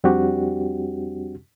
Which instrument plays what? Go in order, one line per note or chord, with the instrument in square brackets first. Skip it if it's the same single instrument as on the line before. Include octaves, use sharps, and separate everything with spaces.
[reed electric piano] F2 G3 C4 D4 F#4 G4